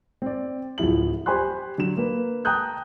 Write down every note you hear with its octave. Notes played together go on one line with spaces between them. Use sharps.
C4 D5
D1 F3 E4 F#7
G4 C5 G#5 B5 C6 F#6
D3 F#3 E7
A#3 B4
G5 A5 A#5 D#6 F#6 G6